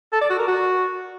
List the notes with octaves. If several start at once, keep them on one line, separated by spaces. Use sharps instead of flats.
A4
D5
F#4
A#4
F#4